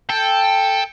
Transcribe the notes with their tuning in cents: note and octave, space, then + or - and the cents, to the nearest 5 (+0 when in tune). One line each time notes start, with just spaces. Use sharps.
A4 +0 G5 +10